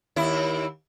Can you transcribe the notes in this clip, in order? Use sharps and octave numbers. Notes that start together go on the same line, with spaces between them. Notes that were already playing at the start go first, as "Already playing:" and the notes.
D#2 E4